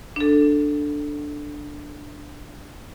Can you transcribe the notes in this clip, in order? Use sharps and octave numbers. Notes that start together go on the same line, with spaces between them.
D4 A4